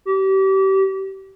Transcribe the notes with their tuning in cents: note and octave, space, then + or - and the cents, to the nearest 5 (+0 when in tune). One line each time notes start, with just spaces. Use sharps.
G4 -30